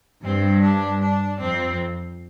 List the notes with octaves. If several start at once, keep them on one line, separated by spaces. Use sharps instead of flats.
G2 C4
D4
D4
F2 C4